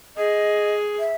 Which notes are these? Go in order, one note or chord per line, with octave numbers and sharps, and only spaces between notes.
G#4 D#5
E5